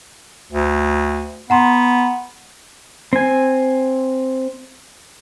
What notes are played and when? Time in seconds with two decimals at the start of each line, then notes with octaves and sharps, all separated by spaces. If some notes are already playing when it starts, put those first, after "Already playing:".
0.52 D2
1.50 B3 F#5 A#5 C6
3.13 C4 G#5